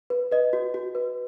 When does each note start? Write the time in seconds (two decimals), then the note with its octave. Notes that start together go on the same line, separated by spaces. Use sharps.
0.10 B4
0.31 B4 D#5
0.53 F#4
0.74 F#4
0.95 B4